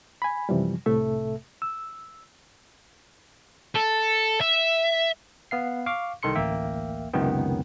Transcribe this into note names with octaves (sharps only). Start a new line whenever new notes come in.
G#5 B5
F#2 C3 E3 F3 G3
C2 A2 C3 A3 A4 E5
E6
A4
E5
B3 F5 C7
F5 C#6 D6
C2 D#3 A4 C6 C#7
A1 D2 A#3 E5 G5
C#2 F#2 C3 D#3 B3 G5